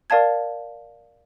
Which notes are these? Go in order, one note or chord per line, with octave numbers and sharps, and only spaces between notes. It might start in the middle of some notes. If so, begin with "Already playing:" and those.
A#4 D5 F5 A5 G#6